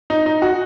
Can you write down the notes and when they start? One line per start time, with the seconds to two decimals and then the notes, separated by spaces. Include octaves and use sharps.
0.10 D#4
0.26 D#4
0.42 F#4